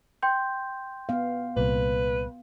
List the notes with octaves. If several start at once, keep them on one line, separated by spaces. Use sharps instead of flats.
G5 C6 G6
B3 F5
C2 A#2 B4